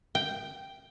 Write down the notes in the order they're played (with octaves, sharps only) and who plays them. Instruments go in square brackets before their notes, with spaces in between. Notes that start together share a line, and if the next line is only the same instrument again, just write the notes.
[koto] G5